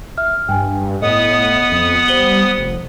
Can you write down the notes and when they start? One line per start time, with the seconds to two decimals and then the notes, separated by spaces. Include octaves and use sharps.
0.18 E5 F6
0.49 G2 G5 G#5
1.02 A2 B3 D#5 F#5 D#6
1.72 F2
2.08 G3 C5 F#7 G7
2.58 F1